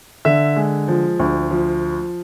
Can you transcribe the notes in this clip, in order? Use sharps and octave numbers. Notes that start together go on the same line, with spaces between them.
D3 E5
G#3
F3
D2
F3